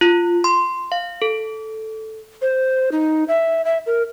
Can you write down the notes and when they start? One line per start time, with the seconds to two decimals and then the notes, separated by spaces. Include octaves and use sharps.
0.01 F4
0.44 C6
0.92 F5
1.22 A4
2.42 C5
2.92 D#4
3.28 E5
3.65 E5
3.86 A#4